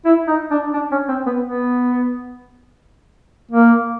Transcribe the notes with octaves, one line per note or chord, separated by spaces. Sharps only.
E4
D#4
D4
D4
C#4
C4
B3
B3
A#3